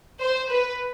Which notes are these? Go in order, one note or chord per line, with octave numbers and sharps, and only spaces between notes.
C5
B4